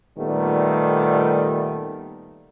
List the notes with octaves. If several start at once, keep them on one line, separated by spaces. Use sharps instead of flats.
A#2 D#3 G3 A3 B3